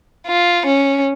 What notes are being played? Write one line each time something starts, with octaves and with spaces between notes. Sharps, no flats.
F4
C#4